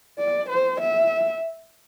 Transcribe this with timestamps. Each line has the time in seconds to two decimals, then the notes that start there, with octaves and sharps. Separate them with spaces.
0.19 D5
0.49 C5
0.80 E5